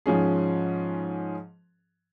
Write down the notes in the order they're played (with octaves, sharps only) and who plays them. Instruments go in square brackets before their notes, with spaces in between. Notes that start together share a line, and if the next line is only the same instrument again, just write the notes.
[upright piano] G#2 F3 C#4 G#4